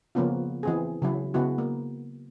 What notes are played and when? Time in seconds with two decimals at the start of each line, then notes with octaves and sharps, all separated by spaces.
0.15 C#3 F3 A#3 B3 C#4 F4
0.63 E3 C4 G#4
1.02 C#3 F#3 E4
1.34 C#3 B3 E4 F#4
1.58 A#3